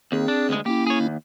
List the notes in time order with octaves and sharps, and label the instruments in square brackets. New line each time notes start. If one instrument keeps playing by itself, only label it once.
[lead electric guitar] D#2 [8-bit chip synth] C4 G#4
[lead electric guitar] D4
D2 G#3
[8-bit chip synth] A#3 C#4 E4 [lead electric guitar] G4
[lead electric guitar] G#4 C#5
D#2